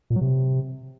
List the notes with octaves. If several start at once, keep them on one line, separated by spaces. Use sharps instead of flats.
A#2
F#3
C3